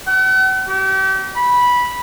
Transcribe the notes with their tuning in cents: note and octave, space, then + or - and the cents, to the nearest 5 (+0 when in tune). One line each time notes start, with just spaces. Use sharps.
F#5 +40
G4 -40
B5 -10